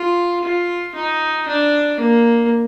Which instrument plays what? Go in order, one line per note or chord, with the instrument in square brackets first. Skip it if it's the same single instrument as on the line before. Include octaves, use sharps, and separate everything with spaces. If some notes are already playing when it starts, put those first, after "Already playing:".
Already playing: [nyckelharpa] F4
F4
D#4
D4
A#3